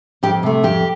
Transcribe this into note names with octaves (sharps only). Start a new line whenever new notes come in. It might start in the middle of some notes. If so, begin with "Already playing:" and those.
F2 G4
C3 A3
F2 G4